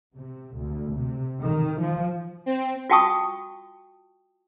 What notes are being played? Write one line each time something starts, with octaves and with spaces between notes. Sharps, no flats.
C3
D2
C3
D#3
F3
C4
F4 F#4 G5 A5 C#6 D#6